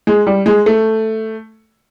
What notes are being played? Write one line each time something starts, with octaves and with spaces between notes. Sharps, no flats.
G#3
G3
G#3
A3